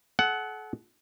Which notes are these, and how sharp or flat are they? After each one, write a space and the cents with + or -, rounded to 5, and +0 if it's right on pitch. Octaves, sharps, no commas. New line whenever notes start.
A4 -40 F#5 +10